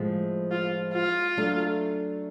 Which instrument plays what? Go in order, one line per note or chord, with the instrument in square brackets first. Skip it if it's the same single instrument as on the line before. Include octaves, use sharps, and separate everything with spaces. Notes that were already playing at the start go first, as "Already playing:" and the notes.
Already playing: [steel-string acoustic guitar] A2 F3 G#3
[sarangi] F4
F4
[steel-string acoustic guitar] F#3 A3 D4